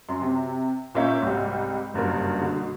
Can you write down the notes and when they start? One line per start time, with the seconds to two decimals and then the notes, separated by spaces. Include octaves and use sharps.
0.09 F#2 C6
0.21 C3
0.94 A#2 A#3 C#4 E5 C#6 G6
1.22 C2 G#2 G3
1.94 F#1 G2 B2 A#4
2.41 B2 D3